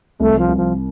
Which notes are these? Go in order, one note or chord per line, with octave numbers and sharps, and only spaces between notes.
C2 A3
F3
C2
F3